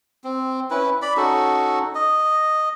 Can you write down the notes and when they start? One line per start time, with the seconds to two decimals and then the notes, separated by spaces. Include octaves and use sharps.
0.24 C4
0.71 C#4 E4 B4
1.02 D5 B5
1.17 C#4 D#4 F#4 A4
1.95 D#5